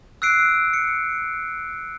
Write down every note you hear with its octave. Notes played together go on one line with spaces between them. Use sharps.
E6 F#6 C7 D7
C#7